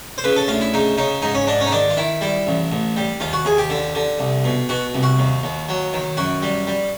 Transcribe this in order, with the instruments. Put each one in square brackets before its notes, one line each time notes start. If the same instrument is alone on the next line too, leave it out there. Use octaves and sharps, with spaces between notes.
[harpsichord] C5
C#3 B4
A4
D2 F4
E4
C#3 D#4
C#3 D#4
G#2 D#4
C#4
G#2 D4
C#4
D#4
D#3 D4
F4
D#3 E4
G3 E4
A1
A1
G3
D#2 F4
F#4
D#2 G#4
G4
D3
D3
C2
B2
B2 F#4
C2
F#4
D#2
D#2
F#3
D#3
F#2 F#4
G3
G3